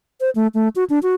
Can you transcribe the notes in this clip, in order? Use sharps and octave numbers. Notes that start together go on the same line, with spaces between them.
C5
A3
A3
F#4
D4
F#4